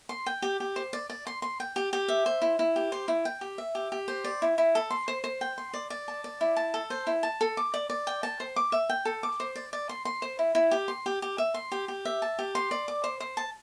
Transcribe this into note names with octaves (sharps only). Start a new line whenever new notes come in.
C6
G5
G4
G4
C5
D5
D5
C6
C6
G5
G4
G4
E5
C5
E4
E4
G4
C5
E4
G5
G4
E5
G4
G4
C5
D5
E4
E4
A4
C6
C5
C5
G5
C6
D5
D5
A5
D5
E4
A5
A4
C5
E4
A5
A4
D6
D5
D5
G5
A5
C5
D6
E5
G5
A4
D6
C5
D5
D5
C6
C6
C5
E4
E4
G4
C6
G4
G4
E5
C6
G4
G4
E5
A5
G4
C6
D5
D6
C5
C5
A5